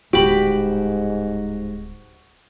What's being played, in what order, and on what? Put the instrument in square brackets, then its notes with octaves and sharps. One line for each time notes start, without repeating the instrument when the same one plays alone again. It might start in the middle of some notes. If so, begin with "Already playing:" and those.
[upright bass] D1 G3 [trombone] G#2 [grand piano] F#4 [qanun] G4 B5